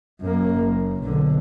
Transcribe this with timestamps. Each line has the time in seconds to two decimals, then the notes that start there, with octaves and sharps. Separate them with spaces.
0.21 F#2 A#3
0.56 F#1
1.03 B1 D3